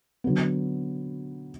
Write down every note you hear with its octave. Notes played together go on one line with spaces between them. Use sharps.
D3 F#3 B3